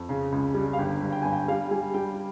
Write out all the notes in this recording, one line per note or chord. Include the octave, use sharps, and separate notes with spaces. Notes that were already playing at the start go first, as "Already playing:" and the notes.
Already playing: F2
C#3
C#2
G3
F5
G1 G5
G2
G5
G2 G#5
G5
G3 F5
G3 G#5
G3 G5